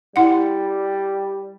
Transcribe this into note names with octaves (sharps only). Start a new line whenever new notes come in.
G3 E4 F#5